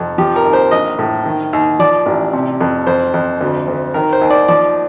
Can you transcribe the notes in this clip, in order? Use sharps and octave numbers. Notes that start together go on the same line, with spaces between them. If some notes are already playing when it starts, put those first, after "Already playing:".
Already playing: F2 C3
F3 G4
A#4
D#2
C5
A#1 D#5
A2
D#3
D#2
F3 D5
A1
C3
F2
F2 C5
F2
D2
D2
D#3 A#4
C5
D#2
D5
F3 D5